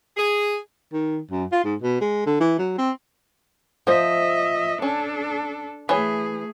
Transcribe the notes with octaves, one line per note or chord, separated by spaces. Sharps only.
G#4
D#3
F#2
F4
G#2
B2
G#3
D3
E3
F#3
C4
F3 C5 D#5 E5
C#4 D4 A4
E3 A3 G#4 C#5